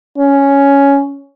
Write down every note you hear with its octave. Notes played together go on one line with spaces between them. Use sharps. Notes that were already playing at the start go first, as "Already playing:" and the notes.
C#4